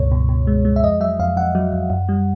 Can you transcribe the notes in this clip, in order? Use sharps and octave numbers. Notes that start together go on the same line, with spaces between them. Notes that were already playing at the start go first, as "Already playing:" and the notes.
Already playing: C#2 G2 B2 C#5
B2
B2
G#3
G#3
E5
F2 D#5
F#3 E5
F2 F5
F2 F#5
F#3
F2
F#2
G3